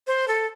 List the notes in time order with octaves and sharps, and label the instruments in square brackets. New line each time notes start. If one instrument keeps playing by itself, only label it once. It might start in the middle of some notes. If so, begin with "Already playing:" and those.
[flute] C5
A4